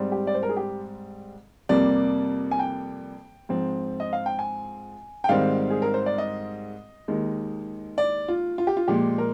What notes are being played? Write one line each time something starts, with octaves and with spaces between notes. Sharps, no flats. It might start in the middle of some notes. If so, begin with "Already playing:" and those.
Already playing: G#2 G3 C4
G4
D5
C5
A#4
G#4
G4
F2 C3 G3 A#3 D5
G#5
G5
G#2 F3 C4
D#5
F5
G5
G#5
G5
G#2 D#3 G3 C4 F5
G#4
A#4
C5
D5
D#5
D#2 D#3 G#3
D5
F4
F4
G4
F4
A#2 F3 G#3 G4
A#4